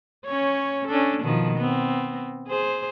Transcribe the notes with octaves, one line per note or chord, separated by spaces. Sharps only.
C#4 C#5
C#4 D4 A4
B2 D#3 F3
B3 C4
G#4 C5